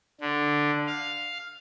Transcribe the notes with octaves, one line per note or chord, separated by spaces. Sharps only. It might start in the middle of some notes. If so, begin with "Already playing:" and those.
D3
F5